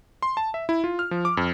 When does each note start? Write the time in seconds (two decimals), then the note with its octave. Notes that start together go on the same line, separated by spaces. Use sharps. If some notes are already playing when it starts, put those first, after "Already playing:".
0.22 C6
0.37 A5
0.54 E5
0.69 E4
0.84 F4
0.99 F6
1.11 F3
1.25 D6
1.37 F2